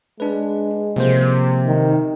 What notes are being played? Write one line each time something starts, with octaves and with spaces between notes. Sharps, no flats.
G#3 D4 B4
C3 F3 A#3 C5
D#3